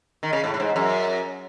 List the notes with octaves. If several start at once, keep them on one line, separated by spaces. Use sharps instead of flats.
D#3
C#3
A2
A2
G#2
F#2